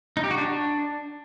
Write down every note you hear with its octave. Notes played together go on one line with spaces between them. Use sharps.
D#4
G4
F#4
D4